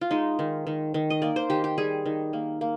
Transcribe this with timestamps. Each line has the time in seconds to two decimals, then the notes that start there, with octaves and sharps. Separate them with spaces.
0.01 F4
0.11 G#3 D#4
0.39 D#3
0.67 D#3
0.94 D#3
1.10 D#5
1.22 A#3 D5
1.36 C5
1.50 D#3 G4
1.64 G4
1.78 G3 G#4
2.06 D#3
2.33 A#3
2.61 A#3